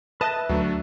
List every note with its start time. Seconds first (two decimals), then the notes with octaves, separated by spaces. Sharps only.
0.21 B4 D#5 E5 A5 F#6
0.49 D2 F#3 A3 D4